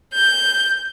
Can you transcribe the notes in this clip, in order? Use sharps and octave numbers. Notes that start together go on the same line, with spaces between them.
G6